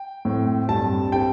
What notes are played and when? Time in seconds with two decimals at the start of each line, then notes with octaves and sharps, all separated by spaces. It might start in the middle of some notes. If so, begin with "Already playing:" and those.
Already playing: G5
0.25 A2 A3 C4
0.69 G2 G3 C4 A5
1.12 G3 C4 G5